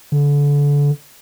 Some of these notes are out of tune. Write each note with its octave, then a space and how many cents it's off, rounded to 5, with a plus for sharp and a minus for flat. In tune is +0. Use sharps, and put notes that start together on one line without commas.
D3 -30